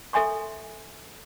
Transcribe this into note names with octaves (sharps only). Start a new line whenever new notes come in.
A4 E5 G#5 C6 C#6